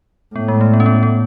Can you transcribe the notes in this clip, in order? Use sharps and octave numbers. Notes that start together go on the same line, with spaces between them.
A2 B3
G#3
A3
B3
C#4
B3
B3